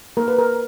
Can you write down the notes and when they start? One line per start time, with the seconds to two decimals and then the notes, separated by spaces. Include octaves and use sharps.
0.17 A#3 A#4
0.28 B4
0.39 A#4